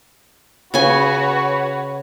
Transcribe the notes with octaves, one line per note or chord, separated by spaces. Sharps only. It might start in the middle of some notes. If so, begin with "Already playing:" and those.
C#3 F#4 B4 C#5 G#5